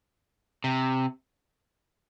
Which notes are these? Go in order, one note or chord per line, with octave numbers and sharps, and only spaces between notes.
C3